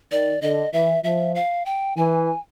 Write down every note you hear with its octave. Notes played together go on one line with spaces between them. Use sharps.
D#3 D5
D3 D#5
E3 E5
F3 E5
F5
G5
E3 G#5